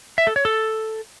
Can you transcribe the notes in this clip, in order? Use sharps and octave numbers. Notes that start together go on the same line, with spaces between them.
E5
A4
C#5
A4